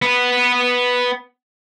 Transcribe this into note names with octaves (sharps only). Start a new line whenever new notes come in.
B3 B4